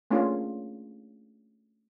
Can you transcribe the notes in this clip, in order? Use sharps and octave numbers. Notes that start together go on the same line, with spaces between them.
A3 A#3 C#4 D4 F4 G#4